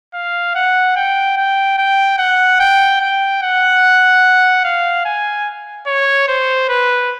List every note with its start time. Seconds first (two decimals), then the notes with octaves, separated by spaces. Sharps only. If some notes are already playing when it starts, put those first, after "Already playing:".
0.14 F5
0.55 F#5
0.96 G5
1.37 G5
1.78 G5
2.19 F#5
2.60 G5
3.01 G5
3.42 F#5
4.65 F5
5.05 G#5
5.87 C#5
6.28 C5
6.69 B4